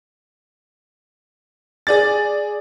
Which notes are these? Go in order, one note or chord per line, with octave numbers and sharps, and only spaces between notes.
G#4 D5 A6